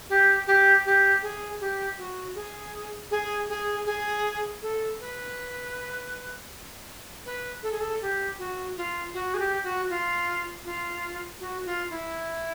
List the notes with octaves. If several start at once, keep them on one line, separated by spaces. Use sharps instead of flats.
G4
G4
G4
G#4
G4
F#4
G#4
G#4
G#4
G#4
A4
B4
B4
A4
G#4
A4
G4
F#4
F4
F#4
G#4
G4
F#4
F4
F4
F#4
F4
E4